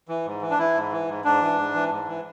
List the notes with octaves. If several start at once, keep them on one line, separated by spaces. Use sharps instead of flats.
E3
G#2
E3
D4
E3 E4
G#2
E3
G#2
G#2 D4
E3
G#2
E3
G#2
E3